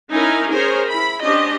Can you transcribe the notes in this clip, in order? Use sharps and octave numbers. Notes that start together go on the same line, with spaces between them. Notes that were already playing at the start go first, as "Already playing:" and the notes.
C#4 D#4 E4 A#4 G#5
G#4 A#4 C5 C#5
E4 B5
C#4 D4 G4 C5 D#5